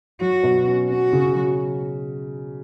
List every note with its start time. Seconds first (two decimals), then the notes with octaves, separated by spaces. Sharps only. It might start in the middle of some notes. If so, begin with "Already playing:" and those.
0.21 F#3 F#4
0.43 B2
0.67 C#4
0.90 C#4 F#4
1.13 C#3
1.35 F#3